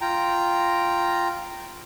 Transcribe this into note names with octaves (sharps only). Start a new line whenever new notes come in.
F4 G5 A#5